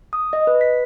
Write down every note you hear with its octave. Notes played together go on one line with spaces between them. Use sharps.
D#6
D#5
B4
B6